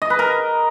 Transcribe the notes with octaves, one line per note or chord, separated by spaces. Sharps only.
D#5
B4
A#4